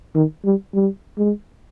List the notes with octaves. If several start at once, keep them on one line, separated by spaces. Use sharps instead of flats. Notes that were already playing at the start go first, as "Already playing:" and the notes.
D#3
G3
G3
G#3